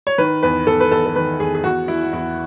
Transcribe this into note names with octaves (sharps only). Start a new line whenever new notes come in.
C#5
D#3 B4
E2 B4
E2 A4
B4
E2 A4
A4
D#3 B4
E2 G#4
G#4
E2 F#4
E3 E4
E2 E4